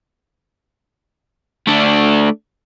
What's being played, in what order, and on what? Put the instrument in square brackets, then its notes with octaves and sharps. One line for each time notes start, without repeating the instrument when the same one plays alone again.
[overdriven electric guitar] A3 D4